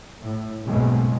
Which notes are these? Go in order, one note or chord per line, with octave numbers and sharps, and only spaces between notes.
A2
F#1 B1 G#2 B2 G#3